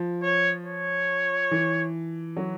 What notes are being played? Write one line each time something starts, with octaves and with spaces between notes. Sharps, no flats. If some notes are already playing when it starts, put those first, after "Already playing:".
Already playing: F3
C#5
C#5
E3
F#3